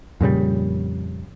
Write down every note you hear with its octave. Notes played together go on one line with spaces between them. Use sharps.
F2 A#2 C#3 G3